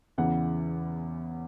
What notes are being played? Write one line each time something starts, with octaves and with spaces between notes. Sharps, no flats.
E2 C#3 E3 F#5